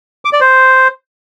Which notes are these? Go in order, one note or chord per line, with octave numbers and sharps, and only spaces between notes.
D6
D5
C5